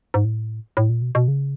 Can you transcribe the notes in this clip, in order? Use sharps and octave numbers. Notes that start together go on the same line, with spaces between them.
G#2
A2
A2
A#2
B2
B2
C#3